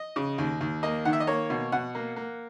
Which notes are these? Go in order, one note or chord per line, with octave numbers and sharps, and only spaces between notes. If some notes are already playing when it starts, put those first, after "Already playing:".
Already playing: D#5
C#3
D#2
D#2
A#3 D#5
D#3 F#5
E5
D#5
A#3 C#5
B2
B2 F#5
A#3
A#3